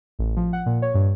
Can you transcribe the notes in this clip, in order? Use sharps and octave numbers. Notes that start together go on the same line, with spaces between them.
A1
F3
F#5
A#2
C#5
G2